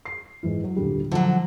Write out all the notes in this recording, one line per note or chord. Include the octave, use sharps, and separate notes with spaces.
C7
G#2 E3 E4
F#3
D#1 D3 G3
D3 F3 F#3